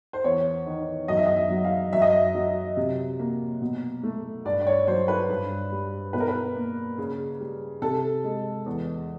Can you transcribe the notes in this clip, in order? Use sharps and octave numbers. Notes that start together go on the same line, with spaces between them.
C5
E2 C#5
D#3
F#2 D#5
E5
D#5
E5
F#3
F5
F#2 E5
D#5
E5
F#3
C3
A#3
B2
A3
G2 D5
D5
C#5
F#3 C5
B4
G2
G3
B2 B4
A#4
B4
A#3
C#3
G3
C3 A4
G#3
E2